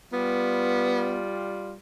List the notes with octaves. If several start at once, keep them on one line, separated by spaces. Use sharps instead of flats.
G3 B3 F4